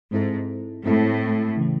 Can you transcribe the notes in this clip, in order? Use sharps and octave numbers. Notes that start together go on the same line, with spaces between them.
G#2 G#3 C4 E4 A4
A2 G#3 C4 E4 A4
C#3 E3 A3